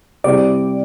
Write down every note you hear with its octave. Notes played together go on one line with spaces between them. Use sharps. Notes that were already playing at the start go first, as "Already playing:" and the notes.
C3 G3 C4 E4 G4 D5